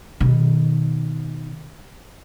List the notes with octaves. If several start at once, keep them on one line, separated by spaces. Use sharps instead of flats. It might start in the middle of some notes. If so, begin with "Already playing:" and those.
B2 D#3